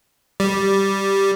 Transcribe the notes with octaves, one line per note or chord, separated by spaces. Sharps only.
G3